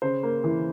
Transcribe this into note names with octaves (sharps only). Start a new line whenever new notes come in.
C#3 C5
A#3
E3